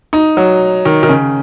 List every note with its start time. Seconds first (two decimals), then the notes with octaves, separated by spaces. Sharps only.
0.13 D#4
0.37 F#3
0.85 D#3
1.03 D#3
1.09 C#3